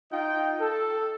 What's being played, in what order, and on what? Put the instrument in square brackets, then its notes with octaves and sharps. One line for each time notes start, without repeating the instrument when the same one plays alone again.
[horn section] D#4 F4 D#5 G5
A4